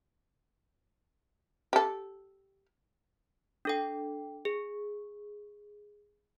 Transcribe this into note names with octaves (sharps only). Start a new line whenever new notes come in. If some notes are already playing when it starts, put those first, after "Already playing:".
G4 A4
D4 A4 G5
G#4